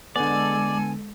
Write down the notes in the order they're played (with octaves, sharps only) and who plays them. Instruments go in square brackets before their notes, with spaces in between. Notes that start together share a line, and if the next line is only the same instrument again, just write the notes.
[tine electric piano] D3 B3 [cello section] G#3 A4 [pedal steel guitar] D5 [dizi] G#5